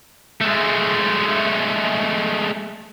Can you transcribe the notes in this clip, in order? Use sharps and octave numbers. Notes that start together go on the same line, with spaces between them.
G#3 A3